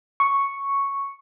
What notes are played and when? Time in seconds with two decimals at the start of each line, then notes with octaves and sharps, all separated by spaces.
0.20 C#6